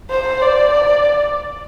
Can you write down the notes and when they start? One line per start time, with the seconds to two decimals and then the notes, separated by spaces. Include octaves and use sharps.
0.11 C5
0.42 D5